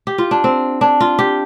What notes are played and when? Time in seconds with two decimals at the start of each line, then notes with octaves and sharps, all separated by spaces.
0.07 G4
0.18 F4
0.31 D4
0.44 C4
0.81 D4
1.00 F4
1.19 G4